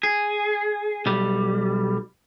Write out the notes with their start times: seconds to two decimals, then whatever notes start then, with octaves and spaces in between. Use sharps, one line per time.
0.03 G#4
1.06 B1 G3